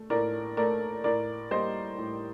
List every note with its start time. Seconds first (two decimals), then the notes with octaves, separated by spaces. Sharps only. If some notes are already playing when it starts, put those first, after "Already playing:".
Already playing: A3
0.10 A2 A#4 D5
0.57 A3 A#4 D5
1.04 A2 A#4 D5
1.51 G3 A#3 C5 D#5
1.98 A2